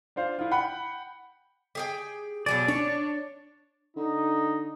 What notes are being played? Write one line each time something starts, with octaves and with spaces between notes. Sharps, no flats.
D4 F4 C5 F5
E4 F4
F#5 G5 B5 F#6
G4 G#4 G5
B2 F#3 G#4 D5
D4 C#5
D3 D#4